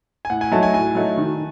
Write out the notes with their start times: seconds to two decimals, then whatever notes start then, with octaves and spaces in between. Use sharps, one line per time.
0.25 G#5
0.30 A2 F#5
0.41 G#5
0.52 F#3 A3 D#4 A5
0.63 G#5
0.74 A2 G#5
0.95 F#3 A3 D#4
1.17 D#3